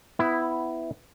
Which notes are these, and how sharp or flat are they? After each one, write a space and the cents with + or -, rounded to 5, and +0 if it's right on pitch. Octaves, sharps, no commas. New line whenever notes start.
B3 +25 E4 +0